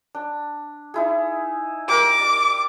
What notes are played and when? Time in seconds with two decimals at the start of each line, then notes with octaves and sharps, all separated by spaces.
0.15 D4
0.94 D#4 E4 G#4
1.89 G4 A#4 C5 D6
2.18 D5